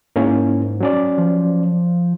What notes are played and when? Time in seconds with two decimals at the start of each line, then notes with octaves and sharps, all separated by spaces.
0.16 G#2 A#3 C#4 E4
0.80 F#3 C#4 D5
1.18 F3